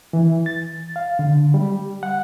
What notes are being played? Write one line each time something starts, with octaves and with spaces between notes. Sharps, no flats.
E3
A6
F5
D3
G3
F#5